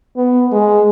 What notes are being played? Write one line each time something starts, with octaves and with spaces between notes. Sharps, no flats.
B3
G#3